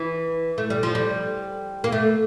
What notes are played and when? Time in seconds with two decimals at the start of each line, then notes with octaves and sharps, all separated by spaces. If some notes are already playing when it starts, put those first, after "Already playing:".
Already playing: E3
0.58 A3
0.70 G3
0.83 F3
0.95 G3
1.84 A#3
1.92 A3